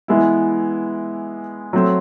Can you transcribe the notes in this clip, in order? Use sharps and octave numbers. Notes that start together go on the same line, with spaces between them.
E3 G#3 B3 E4
F#3 A3 C4